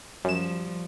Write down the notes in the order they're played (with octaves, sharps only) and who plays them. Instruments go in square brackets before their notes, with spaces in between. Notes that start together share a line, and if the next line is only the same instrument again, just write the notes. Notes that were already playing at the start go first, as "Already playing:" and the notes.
[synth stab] F#2 E7 [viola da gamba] F3 G3